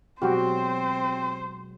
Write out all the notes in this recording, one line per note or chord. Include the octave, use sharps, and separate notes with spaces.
B2 F#3 G#3 C4 F#4 G4 C5